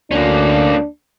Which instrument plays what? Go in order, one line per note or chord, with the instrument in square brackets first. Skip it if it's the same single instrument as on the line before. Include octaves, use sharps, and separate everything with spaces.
[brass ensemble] D2 [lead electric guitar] A#3 C#4 [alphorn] D4